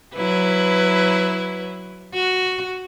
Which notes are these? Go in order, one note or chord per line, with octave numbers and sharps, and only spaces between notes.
F#3 E4 B4
F#4